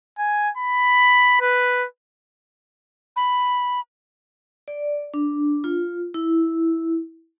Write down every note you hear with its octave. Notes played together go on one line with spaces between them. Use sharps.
G#5
B5
B4
B5
D5
D4
F4
E4